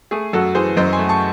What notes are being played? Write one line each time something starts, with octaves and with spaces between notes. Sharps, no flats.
A3 G#4
F#2 F#4 A4
E3 G#4 C5
F#2 C5 D#5
G#5 C6
A3
A5 C#6